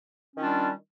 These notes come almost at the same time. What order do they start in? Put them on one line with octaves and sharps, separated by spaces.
C#4 D#3 F4 D4 G3